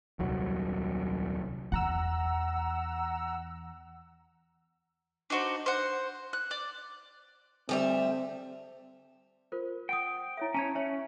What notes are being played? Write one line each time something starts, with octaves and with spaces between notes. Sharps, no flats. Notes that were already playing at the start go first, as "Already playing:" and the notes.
D#1 C2 F#3
E2 F#5 A#5 E6
D4 D#4 F#4 C5
C5 F#5
F#6
D5
D2 G3 C4 E5
F4 A#4 C5
F#5 G5 D#6
E4 C#5 E5
C#4 C#5 A5 A#5 D#7
C#4 C#5 E5